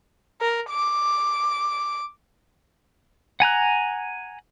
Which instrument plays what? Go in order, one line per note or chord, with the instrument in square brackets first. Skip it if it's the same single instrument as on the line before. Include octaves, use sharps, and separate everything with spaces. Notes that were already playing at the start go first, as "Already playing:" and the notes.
[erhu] A#4
D6
[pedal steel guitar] F#5 G#5 A#5 F#6